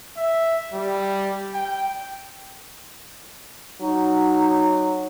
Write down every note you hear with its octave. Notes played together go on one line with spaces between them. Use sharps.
E5
G3
G5
F#3 D#4